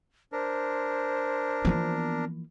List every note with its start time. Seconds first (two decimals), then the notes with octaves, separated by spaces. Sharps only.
0.32 D4 A#4 C5
1.65 E3 F3 A#3 B3 F4